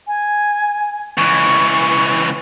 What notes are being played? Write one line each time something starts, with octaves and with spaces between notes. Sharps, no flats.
G#5
C#2 E3 C#6